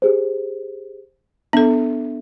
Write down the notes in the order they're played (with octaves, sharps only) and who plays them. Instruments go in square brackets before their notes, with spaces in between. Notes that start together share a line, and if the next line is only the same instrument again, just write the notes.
[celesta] G4 G#4 C5
[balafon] B3 A4 [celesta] D4 E5